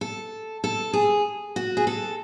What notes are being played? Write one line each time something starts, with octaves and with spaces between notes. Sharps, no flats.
A4
A4
G#4
F#4
G#4
A4